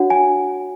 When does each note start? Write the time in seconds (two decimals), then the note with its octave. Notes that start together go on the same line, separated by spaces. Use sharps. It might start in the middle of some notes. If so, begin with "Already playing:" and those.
Already playing: D4 F#4 C#5 F#5
0.10 G#5